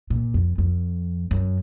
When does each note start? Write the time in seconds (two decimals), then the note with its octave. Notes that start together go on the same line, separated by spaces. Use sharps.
0.10 A#2
0.34 F2
0.58 F2
1.31 F#2